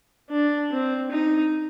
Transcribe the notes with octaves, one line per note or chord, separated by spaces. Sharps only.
D4
C4
D#4